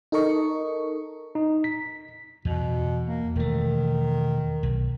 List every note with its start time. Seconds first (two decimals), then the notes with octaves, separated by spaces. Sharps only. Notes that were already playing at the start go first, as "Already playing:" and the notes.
0.12 D#4 A4 A#4 D#5 C#6
1.35 D#4
1.64 B6
2.45 E2 B2
3.06 A#3
3.36 E1 D#3 A3
4.63 B1